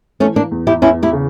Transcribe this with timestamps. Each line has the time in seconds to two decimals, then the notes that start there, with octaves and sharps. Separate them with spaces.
0.20 E3 A3 C#4
0.36 A#3 D4
0.51 E2
0.67 E4 G4
0.82 E2 C#4 E4
1.03 E4 G4
1.13 C#3